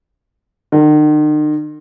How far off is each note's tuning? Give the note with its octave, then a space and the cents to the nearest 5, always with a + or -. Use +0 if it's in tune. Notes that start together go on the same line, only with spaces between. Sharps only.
D#3 -45